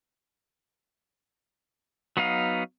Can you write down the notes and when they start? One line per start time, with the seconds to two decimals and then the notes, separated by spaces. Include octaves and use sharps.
2.17 F#3 B3 D#4 F5